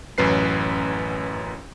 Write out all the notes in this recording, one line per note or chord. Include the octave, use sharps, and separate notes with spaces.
A1 F#2 C#4 B4 C7